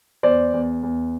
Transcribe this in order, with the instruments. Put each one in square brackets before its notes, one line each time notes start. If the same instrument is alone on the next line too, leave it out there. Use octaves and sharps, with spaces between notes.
[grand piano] E2 C5 D5
E2
E2